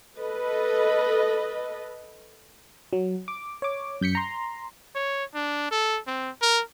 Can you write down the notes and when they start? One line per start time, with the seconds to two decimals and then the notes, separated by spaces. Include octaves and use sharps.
0.19 A4 B4 D#5
2.93 F#3
3.28 D6
3.62 C#5 D6
4.01 F#2 G6 B6 C#7
4.15 A#5 C6
4.95 C#5
5.34 D4
5.71 A4
6.07 C4
6.42 A#4